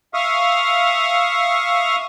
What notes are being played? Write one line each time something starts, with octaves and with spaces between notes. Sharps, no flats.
E5 F5 C#6 D#6 F6